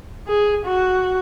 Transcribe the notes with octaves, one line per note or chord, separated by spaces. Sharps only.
G#4
F#4